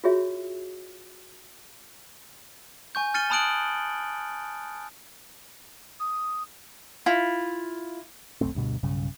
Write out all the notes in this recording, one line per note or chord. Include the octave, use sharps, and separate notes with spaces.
F4 F#4 G#4 C#5 E5
G#5 C#6 G6
F6 A6 C#7 D#7 G7
A5 B5 D#6 F#6 D7 F#7
D#6
E4 F4
F1 B1 A3 C4
D2 G2 B2
B1 G2 C#3